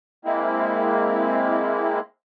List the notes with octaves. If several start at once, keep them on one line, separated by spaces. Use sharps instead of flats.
G#3 A#3 C4 E4